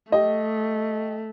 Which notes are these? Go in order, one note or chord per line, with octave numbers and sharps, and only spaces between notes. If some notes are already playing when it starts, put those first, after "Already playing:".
A3 G4 D#5